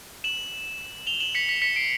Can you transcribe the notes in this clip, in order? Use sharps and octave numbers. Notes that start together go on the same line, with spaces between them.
E7 F#7
F7 G7
E7 F#7
B6 C#7
B6 C#7
B6 C#7
C7 D7